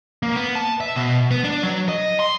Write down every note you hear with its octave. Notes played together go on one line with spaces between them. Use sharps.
A#3
B3
A5
E5
B2
B3
D4
F#3
D#5
C6